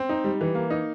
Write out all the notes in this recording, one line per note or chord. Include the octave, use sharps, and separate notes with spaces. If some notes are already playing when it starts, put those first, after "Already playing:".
Already playing: C4
D#4
G3
E3
A#3
D#4